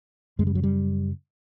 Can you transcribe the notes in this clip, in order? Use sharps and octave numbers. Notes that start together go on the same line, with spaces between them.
F#2 C#3 G#3
G3
F#3
G3